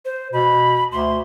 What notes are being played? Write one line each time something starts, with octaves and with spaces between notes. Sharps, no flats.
C5
B2 B5
D2 C6